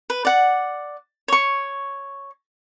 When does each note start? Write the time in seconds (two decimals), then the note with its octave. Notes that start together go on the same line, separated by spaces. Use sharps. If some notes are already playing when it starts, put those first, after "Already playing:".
0.10 B4
0.25 D5 F#5
1.28 C#5 C#6